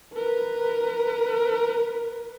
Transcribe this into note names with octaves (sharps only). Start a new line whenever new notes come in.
A#4 B4